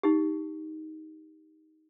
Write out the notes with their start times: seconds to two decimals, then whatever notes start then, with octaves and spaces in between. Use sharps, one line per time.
0.03 D#4 G4